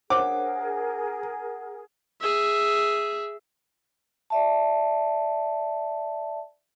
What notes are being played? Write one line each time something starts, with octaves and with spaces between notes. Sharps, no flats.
D4 G#4 A#4 C5 C#5 F#5 D6
G#4 E5
D5 E5 A5